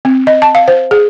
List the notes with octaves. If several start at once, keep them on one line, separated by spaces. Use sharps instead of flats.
C4
D#5
A5
F5
C5
G#4